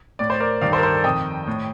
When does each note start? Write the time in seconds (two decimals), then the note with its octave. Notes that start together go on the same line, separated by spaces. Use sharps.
0.19 A2 D5
0.30 C5
0.40 A#4 D5
0.61 G2 D#3 D5 F5
0.72 A4 C5
0.78 A#4
0.83 A4 C5
0.94 A4
1.04 F2 D#3 D#5 G5
1.47 A2